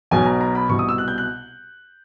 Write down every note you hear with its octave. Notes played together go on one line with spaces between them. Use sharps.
B1 B2 G#5
A#5
A#5
B5
C2 B2 C#6
D#6
E6
F#6
G6
F#6